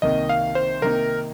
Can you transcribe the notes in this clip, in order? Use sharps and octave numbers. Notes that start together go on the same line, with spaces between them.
C2 C3 D#3 A#3 D#5
F5
C5
C3 D#3 A#3 D#4 A#4